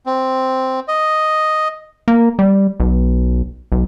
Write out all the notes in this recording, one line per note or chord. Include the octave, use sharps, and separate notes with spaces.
C4
D#5
A#3
G3
B1
B1